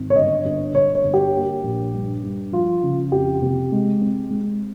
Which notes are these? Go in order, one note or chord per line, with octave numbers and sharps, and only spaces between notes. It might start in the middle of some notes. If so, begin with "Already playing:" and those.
Already playing: G#1
C#5
G1 D#5
G1
G1 C#5
C#5
G1
G4
A#3
A#1
G2
G2
F3 F4
C#3
F2 G4
C3
G#3
C4
G#3